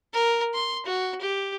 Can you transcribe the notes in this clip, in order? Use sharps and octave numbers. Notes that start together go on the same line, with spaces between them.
A#4
C6
F#4
G4